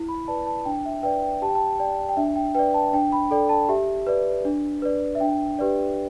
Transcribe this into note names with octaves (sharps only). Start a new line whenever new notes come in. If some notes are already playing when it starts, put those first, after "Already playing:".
Already playing: E4
B5
B4 D5 A5
A5
D4 G5
E5
B4 D5 G5
G5
G4 A5
G5
A5
D5 G5
G5
D4 E5
G5
B4 D5 G5
A5
D4 G5
B5
A4 D5 G5
A5
G4 E5
B4 D5
D4
B4 D5
E5
D4 G5
G4 B4 D5